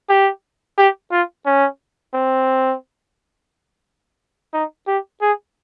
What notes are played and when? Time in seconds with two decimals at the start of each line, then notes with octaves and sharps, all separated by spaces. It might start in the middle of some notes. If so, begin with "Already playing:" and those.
0.09 G4
0.78 G4
1.12 F4
1.46 C#4
2.14 C4
4.53 D#4
4.88 G4
5.22 G#4